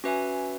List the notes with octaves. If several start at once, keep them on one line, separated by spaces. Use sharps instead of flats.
C#4 F#4 B4 E5 G#5